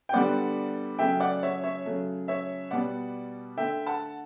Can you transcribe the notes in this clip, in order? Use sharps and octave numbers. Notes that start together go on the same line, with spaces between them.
G5
D3 G3 B3 D5 F#5
C#3 F#3 A3 E5 G5
D5 F#5
C#5 E5
C#5 E5
C#3 F#3 A3
C#5 E5
B2 G3 B3 D5 F#5
D3 A3 E5 G5
F#5 A5